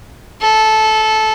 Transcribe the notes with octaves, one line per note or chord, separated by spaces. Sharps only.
A4